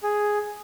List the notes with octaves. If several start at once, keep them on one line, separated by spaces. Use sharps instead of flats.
G#4